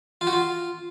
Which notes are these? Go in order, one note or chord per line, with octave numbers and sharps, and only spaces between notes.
F4
F#4
F4